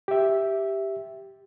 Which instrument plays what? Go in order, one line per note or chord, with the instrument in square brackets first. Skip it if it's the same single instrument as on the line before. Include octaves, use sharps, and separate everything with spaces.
[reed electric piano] G4 E5